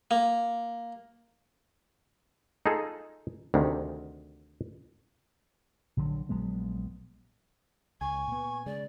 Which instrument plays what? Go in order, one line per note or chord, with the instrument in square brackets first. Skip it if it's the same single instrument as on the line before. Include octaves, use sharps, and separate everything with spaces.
[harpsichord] A#3
[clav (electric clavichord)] D#4 F4 G#4 A4
D2 C3 D#3
[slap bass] A#1 D3 F3 F#3
A#1 F#3 G#3 B3
[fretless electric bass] C#2 [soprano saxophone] G#5 [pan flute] C#6
[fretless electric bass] A#2 B3
[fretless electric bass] C#3 G#3 [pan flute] D5